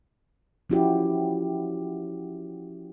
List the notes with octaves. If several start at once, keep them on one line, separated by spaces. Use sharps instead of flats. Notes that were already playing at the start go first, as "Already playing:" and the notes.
F3 C#4 E4 F#4 G4